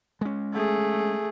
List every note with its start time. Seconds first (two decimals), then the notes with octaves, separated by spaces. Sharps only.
0.21 G#3 C#4
0.54 A3 G#4